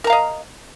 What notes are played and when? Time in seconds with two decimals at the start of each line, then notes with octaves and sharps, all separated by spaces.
0.04 A#4
0.07 A#5
0.10 F5
0.12 D#5